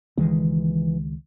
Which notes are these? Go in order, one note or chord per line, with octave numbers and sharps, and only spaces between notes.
C#2 D#3 E3 G#3